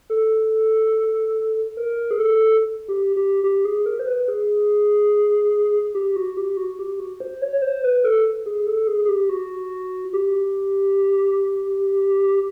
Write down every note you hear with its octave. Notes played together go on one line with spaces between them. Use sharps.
A4
A#4
G#4
A4
G4
G4
G4
G#4
A#4
C5
B4
G#4
G4
F#4
G4
F#4
G4
F#4
C5
C#5
C#5
C5
B4
A4
G#4
A4
G#4
G#4
G4
F#4
G4